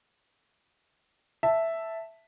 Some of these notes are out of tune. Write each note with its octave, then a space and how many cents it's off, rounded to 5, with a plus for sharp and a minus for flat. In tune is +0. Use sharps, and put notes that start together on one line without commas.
E5 +0 A5 +0